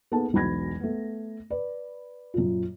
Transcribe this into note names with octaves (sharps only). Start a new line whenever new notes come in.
A#3 B3 D#4 G#4 A4 A5
E1 B1 F#4 B5 G#6 A#6
A3 B3
B4 D5
F#2 A#2 F4